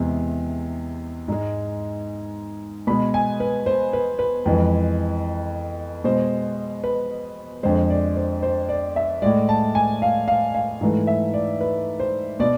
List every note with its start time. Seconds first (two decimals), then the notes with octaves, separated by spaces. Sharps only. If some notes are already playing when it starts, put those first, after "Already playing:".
Already playing: E2 C3 G#3
1.28 G#2 G#3
2.87 B2 G#3 B5
3.14 G#5
3.40 B4
3.66 C5
3.93 B4
4.19 B4
4.46 F2 E3 G#3
6.04 B2 G#3 C5
6.84 B4
7.63 F2 D3 G#3 C5
7.90 D5
8.16 C5
8.43 C5
8.69 D5
8.96 E5
9.22 A2 G#3 D5
9.49 A5
9.75 G#5
10.02 F5
10.28 F5
10.55 F5
10.81 G#2 E3 A3
11.07 E5
11.34 D5
11.61 B4
12.00 C5
12.40 B2 D5